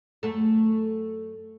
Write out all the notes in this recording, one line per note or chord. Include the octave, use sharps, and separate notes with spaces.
F#2 A3 A4